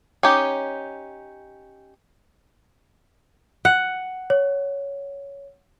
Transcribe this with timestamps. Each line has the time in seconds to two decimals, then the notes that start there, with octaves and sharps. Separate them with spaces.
0.23 C#4 D#4 G4
3.65 F#5
4.30 C#5